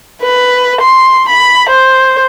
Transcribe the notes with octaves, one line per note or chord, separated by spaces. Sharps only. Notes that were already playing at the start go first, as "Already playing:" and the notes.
B4
C6
B5
C5